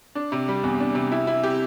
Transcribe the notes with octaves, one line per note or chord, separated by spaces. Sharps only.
D4
C3
G3
E2
D4
C3
E4
E4
G4